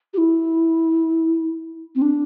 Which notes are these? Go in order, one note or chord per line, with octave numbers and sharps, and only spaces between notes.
G4
E4
C4
D4